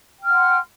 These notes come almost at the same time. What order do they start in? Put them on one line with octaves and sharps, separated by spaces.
G5 F6 F#5 C6